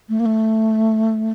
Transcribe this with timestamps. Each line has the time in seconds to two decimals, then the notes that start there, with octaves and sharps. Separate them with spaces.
0.09 A3
0.20 A#3
0.26 A3